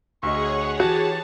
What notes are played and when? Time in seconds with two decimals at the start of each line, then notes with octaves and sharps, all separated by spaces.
0.23 D2 F#4 G#4 C#5 D#5 F#5 C#6
0.80 E3 F#4 G4 A5